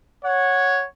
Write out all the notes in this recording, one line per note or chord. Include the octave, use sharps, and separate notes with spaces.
C#5 F#5